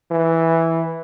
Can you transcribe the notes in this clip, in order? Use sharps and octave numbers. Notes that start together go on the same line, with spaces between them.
E3